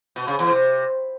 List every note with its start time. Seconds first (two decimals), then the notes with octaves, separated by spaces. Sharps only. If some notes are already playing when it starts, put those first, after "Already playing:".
0.16 B2
0.27 C#3
0.39 E2
0.50 C3